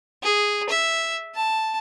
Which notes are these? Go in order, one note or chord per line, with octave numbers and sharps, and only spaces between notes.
G#4
E5
A5